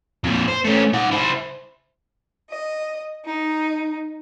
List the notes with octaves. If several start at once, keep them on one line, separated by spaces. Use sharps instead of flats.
F2 A#2
C5
A3 C#4
D#4 F#5
E4 C5
D#5
D#4